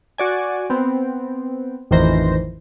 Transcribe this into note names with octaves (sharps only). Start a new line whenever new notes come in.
F#4 D5 G#5
B3 C4
A1 F2 D#3 E3 C5 A#6